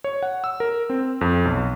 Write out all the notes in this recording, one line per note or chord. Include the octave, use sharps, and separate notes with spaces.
C#5
F#5
E6
A#4
C4
F2
B1